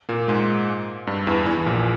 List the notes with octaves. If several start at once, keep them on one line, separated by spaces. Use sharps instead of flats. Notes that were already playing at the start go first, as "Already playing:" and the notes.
A#2 A#3
G#2 G#3
G2 G3
E2 E3
E2 E3
A#1 A#2